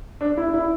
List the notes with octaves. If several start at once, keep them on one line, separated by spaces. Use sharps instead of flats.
D4
E4
E4